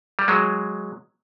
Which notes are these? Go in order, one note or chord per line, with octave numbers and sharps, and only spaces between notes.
G3
F#3 G#3